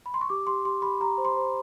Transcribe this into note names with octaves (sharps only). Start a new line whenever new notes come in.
B5
C6
C#6
G4 D6
G4 C6
G4 C6
G4 B5
G4 A#5
C5
C6
C5